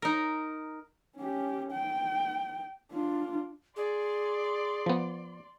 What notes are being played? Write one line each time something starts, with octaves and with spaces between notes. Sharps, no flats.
D#4 A#4
C#4 G4
G5
D4 F4
G#4 D5 C6
F3 B3